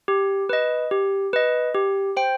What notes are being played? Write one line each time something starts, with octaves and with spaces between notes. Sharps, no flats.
G4
B4 D#5
G4
B4 D#5
G4
C5 G5